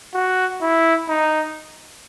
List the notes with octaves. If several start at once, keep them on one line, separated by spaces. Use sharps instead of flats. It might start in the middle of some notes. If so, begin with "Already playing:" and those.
F#4
E4
D#4